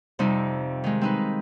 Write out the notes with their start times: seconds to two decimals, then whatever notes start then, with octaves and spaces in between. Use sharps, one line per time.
0.19 F2 C3 G3 D#4
0.84 D#3 G#3
1.01 C4 D#4 B4